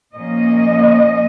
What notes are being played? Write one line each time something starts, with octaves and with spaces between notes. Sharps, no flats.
A#2 F3 A#3 C#4 D#5